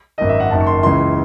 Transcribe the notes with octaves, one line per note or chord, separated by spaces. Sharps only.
G#1 F#2 D#3 D#5
E5
F#5
F#1 F#2 D#3 A5
C#6
C6
C#2 C#3 E3 C6